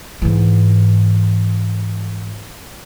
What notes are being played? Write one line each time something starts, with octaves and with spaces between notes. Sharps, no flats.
G#2 E3